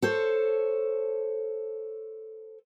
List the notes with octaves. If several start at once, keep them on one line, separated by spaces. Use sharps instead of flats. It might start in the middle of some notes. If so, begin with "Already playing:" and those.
A4 C5 C#5